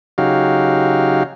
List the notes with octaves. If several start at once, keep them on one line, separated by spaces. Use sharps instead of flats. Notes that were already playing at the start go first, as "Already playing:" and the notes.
C#3 F#3 D#4 F#4 G4 F5